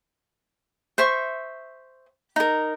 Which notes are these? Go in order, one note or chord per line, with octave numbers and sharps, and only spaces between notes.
C5 E5 C#6
D#4 A#4